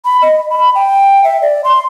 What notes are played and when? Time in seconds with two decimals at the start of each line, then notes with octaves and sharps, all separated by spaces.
0.05 B5
0.22 D#5
0.50 B5
0.75 G5
1.24 E5
1.42 D5
1.64 C6